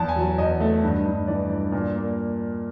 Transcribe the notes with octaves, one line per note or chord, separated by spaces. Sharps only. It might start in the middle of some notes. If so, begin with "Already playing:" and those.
Already playing: E2 A5
G#5
F#3
E2 D#5
A3
G2
G2
E3 D5
G2
A#2
A#3